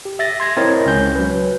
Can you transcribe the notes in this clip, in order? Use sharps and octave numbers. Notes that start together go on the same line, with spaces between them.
G4
E5 A6 A#6
C6 G#6 A#6
C4 E4 A#4 C#5 D#5
C#2 C#4 G6
F#3 B4